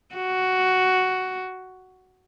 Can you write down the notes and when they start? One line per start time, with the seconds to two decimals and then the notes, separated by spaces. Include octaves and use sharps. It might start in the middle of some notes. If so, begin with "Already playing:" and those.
0.15 F#4